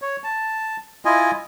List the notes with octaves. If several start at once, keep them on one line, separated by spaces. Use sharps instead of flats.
C#5
A5
E4 F4 D#5 G#5